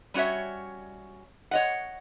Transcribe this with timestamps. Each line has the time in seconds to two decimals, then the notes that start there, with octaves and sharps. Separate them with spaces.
0.14 G3 C#4 F#4 C#5 E5
1.51 C#5 D#5 F#5